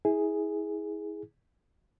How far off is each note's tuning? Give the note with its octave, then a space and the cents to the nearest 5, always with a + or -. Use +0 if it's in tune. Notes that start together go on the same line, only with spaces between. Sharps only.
E4 -30 G#4 +0